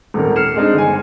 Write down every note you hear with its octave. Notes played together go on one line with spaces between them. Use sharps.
D#1 G#1 A#4
F6 C7 C#7 E7
G#3 C4 D4 D#4
G1 G#5